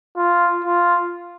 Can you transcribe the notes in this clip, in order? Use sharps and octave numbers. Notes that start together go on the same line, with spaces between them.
F4
F4